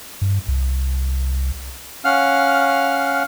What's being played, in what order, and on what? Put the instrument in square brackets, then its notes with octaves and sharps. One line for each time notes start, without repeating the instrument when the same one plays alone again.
[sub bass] G2
C2
[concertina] C#4 F5 F#5 F6